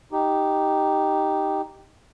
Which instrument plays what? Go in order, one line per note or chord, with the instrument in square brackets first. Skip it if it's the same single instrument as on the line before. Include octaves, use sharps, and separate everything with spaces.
[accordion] D#4 G4